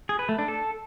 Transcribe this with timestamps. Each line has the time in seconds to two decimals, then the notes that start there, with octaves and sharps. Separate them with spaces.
0.09 G#4
0.19 B4
0.29 A3
0.39 D4
0.48 A4